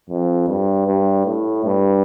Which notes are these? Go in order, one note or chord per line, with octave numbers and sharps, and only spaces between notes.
F2
G2
G2
A2
G2